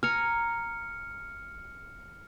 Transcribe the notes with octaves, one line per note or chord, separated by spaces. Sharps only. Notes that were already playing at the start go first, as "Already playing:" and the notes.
G#5 A#5 F6 C#7